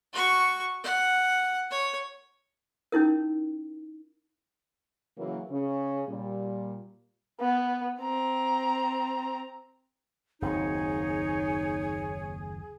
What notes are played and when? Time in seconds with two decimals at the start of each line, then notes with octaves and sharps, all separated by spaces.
0.13 F#4 C#6
0.84 F#5
1.71 C#5
2.92 C#4 D#4 E4 A#4
5.18 C#3 E3 F#3 A#3
5.50 C#3 C#4
6.08 A#2 G3
7.40 B3
8.00 C4 A#5
10.42 F#1 D#2 C4 D#4 G#4 C#5